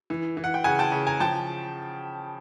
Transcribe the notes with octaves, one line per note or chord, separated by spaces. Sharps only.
E3
E3
F#5
G5
C#3 F#5 G#5
G5 A5
C#3
G#5 A#5
F3 G5 A5